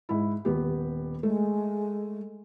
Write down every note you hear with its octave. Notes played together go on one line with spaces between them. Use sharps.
G#2 E4
D#1 B3 G4
G#3 A3